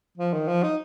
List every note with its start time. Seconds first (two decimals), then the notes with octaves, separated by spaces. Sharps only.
0.18 F3
0.33 D#3
0.48 F3
0.63 D#4